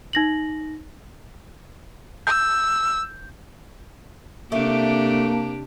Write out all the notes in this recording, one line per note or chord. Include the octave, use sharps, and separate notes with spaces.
D#4 A#6 F#7
E6 G6
C3 A3 A#3 D4 G4